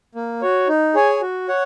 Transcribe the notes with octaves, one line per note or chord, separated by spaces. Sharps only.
A#3
F#4 C#5
D#4
G#4 C#5 G#5
F#4
C#5 F#5